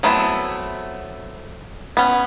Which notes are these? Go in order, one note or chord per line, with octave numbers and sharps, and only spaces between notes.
F#3 A3 B3 C4 E4
B3 C#4